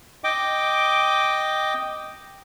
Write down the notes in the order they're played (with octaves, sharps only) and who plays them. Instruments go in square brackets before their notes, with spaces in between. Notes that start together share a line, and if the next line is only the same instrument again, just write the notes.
[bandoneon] D#5 G5 D6